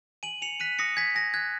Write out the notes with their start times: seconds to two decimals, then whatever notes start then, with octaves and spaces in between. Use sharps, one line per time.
0.23 G#5 D#7 F#7
0.42 G#5 C#7 F7
0.60 F#6 B6 D#7
0.79 D#6 A#6 C#7
0.97 G#5 G#6 B6
1.15 G#5 A#6
1.34 F#6 G#6